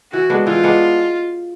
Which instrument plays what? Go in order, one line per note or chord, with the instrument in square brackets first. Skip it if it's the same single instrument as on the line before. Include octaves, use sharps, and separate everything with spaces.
[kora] E3 [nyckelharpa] F#4
[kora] G#3 B3 D4
[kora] E3 [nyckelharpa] F4
[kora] G#3 B3 D4